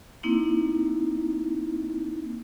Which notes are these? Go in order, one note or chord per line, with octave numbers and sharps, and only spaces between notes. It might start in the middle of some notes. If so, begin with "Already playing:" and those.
A#3 C4 D#4 E4